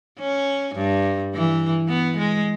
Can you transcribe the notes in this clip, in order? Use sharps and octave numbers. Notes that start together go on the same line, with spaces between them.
C#4
G2
E3
B3
G#3